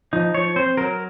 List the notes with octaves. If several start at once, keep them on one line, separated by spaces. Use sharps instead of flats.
F3 D#4
F3 C#5
C4 C5
F#3 A#4